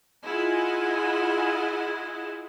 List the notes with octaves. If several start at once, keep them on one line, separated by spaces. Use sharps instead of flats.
E4 F4 G#4 D#5 F#5 G#5